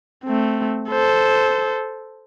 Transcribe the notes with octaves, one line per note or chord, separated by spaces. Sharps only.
A3 C4
A4 C5